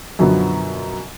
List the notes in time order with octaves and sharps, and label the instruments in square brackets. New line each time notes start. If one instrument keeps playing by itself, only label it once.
[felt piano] F#2 B2 D3 F3 F#3 B3